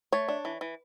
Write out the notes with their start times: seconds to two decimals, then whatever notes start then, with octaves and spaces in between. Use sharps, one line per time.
0.13 A3 C#5
0.28 D4
0.45 E3
0.61 E3